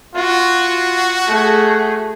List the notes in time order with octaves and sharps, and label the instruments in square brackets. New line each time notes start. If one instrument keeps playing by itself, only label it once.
[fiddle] F4 [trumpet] F#4
[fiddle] A3 G#4